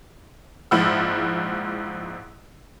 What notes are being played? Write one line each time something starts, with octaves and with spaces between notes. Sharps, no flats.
A#1 G#2 F3 E4 F#5 E6